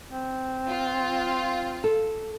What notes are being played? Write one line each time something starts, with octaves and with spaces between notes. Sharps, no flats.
C4
F4
A4